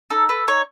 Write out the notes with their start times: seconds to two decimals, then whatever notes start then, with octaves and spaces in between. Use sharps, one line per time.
0.10 D#4 A4
0.29 A4 B4
0.48 D#4 C#5